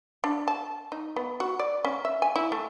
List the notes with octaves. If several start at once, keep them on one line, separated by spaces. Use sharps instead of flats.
D4
A5
D#4
B3
F#4
D5
C#4
E5
G#5
E4
A3